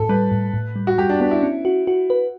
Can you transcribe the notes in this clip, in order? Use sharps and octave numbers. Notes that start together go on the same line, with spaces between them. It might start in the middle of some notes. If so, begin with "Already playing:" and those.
Already playing: A2 A4
G3 B4
A2
A2
G3
F#4
G3 G4
D4
B3 D4
E4
C#4
F#4
F#4
B4